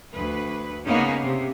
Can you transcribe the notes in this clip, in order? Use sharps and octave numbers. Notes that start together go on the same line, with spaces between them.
D2 B4
C#3 A#3 B3 C#4 D#4
C3